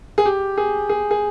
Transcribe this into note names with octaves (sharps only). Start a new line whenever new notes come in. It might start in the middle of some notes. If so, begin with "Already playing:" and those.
G#4
G4
G#4
G#4
G#4